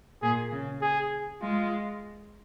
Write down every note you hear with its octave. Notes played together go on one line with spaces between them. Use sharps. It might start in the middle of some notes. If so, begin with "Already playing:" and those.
A#2 G#4
C#3
G#4
G#3 F4